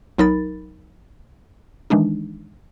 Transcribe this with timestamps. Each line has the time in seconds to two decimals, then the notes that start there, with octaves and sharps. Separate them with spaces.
0.18 B1 F#3 D#4 A#4 B5 A6
1.90 D#3 E3 G#3 D4 D#4